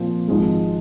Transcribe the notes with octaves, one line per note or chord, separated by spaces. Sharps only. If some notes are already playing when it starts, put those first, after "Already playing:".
Already playing: A#2 F3 C4 F4
G#1 G#2 F3 G#3